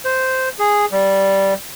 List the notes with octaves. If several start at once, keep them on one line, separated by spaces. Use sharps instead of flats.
C5
G#4
G3